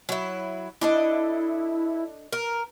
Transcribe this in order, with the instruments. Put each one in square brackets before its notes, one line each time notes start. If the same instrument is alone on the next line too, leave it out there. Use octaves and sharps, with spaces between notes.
[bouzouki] F#3 E4
[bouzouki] D4 A4 D#5 [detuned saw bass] E4
[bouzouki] A#4